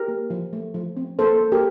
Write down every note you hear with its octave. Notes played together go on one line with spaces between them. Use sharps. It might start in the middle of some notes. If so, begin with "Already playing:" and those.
Already playing: G4 A#4
A#3
F3
A3
F3
C4
A#3 A4 C5
A#3
G4 A#4